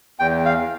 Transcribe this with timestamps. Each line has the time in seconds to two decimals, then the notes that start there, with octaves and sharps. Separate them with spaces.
0.19 E2 G5
0.45 F5